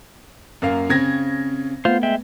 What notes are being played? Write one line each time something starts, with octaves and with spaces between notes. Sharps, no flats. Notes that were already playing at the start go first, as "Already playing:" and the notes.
F#2 A#3 F5
C#3 C4 G#6 A#6
A3 B3 F4 C5
G#3 E5 G5